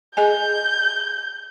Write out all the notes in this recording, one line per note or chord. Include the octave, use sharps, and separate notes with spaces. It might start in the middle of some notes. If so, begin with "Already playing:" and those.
G#4 D#5 G#5 G6